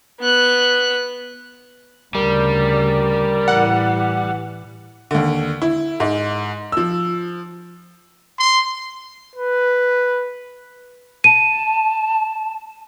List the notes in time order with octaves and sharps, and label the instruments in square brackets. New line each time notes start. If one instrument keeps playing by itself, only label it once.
[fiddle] B3 F#6
[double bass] D2 C#3 [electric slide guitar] G3 [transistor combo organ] A#4 D5
[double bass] A2 E3 [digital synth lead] F#5
[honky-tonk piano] D#2 D3
E4
G#2
F3 E6
[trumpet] C6
[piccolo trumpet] B4
[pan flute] A5 [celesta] D#7